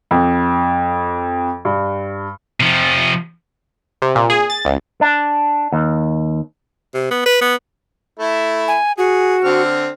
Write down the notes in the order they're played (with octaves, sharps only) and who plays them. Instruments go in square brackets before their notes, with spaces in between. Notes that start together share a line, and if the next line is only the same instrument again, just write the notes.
[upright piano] F2
G2
[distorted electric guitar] C3 F3
[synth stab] C3
A#2
G#4
A6
C#2
[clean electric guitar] D4
D#2
[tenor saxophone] C3
B3
B4
B3
[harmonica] A3 E4
[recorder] G#5
[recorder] F#4 [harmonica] G#4
[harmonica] D3 C4 F6